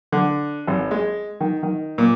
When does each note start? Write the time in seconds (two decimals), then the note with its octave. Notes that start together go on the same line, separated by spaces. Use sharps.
0.12 D3
0.67 G#1
0.91 G#3
1.41 D#3
1.63 D#3
1.98 A#2